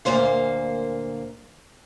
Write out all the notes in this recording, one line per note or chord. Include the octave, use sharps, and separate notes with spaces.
D2 A#2 A#3 C5 F5